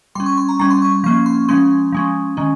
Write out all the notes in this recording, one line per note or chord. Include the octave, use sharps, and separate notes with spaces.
G3 C#4 C6
C#6
C6
A#5
G3 C#4 A#5
C6
C#6
F3 A#3 C#4 C#6
C6
F3 G#3 C#4 C6
F3 G#3 C#4
D#3 G#3 C#4